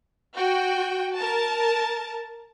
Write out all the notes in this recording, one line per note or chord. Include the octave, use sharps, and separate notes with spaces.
F#4 G5
A#4 A5